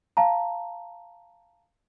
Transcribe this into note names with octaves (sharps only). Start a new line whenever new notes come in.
F5 A5 A#5